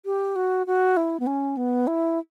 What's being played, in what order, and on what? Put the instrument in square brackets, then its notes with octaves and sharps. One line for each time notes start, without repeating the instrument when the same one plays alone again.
[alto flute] G4
F#4
F#4
E4
B3
C#4
B3
E4